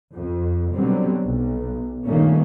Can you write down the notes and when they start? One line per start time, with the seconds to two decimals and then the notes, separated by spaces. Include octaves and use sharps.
0.12 F2
0.74 B2 D3 F#3 G3 C4
1.25 B1
2.06 G2 A#2 D#3 A3 A#3 C#4